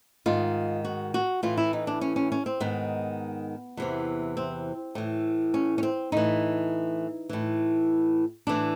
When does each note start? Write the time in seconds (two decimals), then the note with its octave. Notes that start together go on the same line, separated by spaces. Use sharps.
0.26 G#2 D#3 F4
0.85 F#4
1.14 F#4
1.43 A2 E3 F4
1.58 E4
1.73 D#4
1.87 D4
2.01 C#4
2.16 C#4
2.32 C#4
2.46 C4
2.60 G#2 D#3 B3
3.77 E2 C3 E3
4.37 C4
4.95 A2 E3
5.54 C#4
5.78 C#4
5.83 C4
6.12 A2 E3 D#4
7.29 A2 E3
8.47 A2 E3 D4